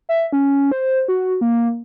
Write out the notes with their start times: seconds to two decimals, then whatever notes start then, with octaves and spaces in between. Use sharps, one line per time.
0.09 E5
0.33 C#4
0.71 C5
1.08 F#4
1.41 A#3